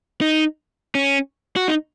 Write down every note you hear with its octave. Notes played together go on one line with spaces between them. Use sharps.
D#4
C#4
F#4
D#4